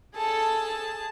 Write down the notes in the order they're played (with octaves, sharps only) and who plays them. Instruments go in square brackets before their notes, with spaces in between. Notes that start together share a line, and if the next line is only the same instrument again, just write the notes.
[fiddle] G#4 A5 [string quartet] A4